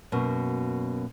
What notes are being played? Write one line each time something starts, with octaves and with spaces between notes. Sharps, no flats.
F#2 B2 A#3